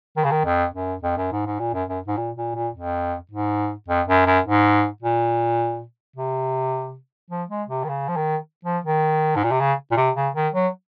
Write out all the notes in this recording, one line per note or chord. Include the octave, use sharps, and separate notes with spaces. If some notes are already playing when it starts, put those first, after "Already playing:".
D#3
C#3
D#3
F2
F#2
F2
F#2
G#2
G#2
A#2
F#2
F#2
G#2
A#2
A#2
A#2
F2
G#2
F2
F#2
F#2
G#2
A#2
C3
F3
G#3
C3
D#3
C#3
F3
D#3
F3
D#3
G#2
A#2
C3
C#3
A#2
C3
C#3
D#3
F#3